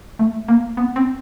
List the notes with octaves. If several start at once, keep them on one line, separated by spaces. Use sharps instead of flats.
A3
A#3
B3
C4